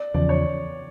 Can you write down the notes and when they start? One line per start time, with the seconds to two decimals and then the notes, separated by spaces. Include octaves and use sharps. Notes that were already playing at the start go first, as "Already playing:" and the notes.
Already playing: D5
0.14 E2 C#3 F3 D5
0.29 C#5